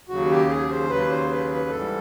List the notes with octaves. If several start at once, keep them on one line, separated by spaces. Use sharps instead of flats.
D#2 C#3 F#3 F#4
G4
G#4
C5
D#2 C#3 F#3 B4
C5
B4
B4
G#2 E3 G3 A4